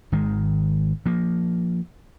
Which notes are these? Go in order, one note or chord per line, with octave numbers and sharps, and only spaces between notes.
G#1 D#3 G#3
F3 A#3